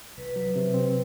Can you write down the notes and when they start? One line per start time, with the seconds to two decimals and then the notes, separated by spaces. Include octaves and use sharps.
0.17 C2 B4
0.30 B4
0.36 F#3
0.43 B4
0.55 C3 B4
0.74 C4